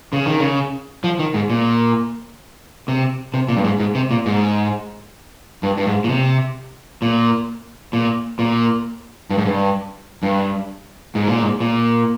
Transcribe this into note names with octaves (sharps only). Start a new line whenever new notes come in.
C#3
D#3
C#3
F3
D#3
G#2
A#2
C3
C3
A#2
G2
G#2
G#2
C3
A#2
G#2
G2
G2
G#2
A#2
C3
A#2
A#2
A#2
G2
G#2
G2
G2
G#2
A#2
G#2
A#2